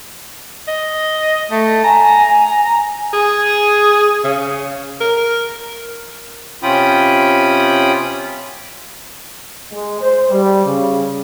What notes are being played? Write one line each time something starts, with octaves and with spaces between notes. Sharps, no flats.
D#5
A3
G#5 A#5
G#4
C#3
A#4
C3 C#4 F4 G5 B5 D#6
G#3
C5
G3
C#3